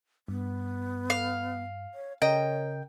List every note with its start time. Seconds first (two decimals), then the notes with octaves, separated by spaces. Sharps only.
0.28 G2 B3
1.10 F5
1.94 C#5
2.22 C#3 A#4 C#5 D#5 G5